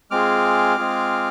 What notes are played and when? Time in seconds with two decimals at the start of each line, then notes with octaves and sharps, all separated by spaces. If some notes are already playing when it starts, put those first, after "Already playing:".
0.11 G#3 C4 F4 G#4 D6 F6
0.77 G#3 C4 F4 G#4